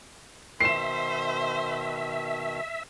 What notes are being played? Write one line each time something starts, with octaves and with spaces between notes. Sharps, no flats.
B2 D#3 C5 E5 C7 E7